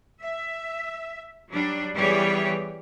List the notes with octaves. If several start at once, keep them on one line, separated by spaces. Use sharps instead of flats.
E5
F#3 G3 D4
E3 G3 B3 G4 G#4 C#5